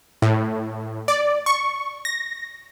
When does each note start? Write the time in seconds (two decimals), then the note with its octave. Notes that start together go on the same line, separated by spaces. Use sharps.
0.22 A2
1.08 D5
1.46 C#6
2.05 A#6